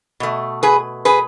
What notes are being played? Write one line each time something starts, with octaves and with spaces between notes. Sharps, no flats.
B2 A3
G#4 B4
G#4 B4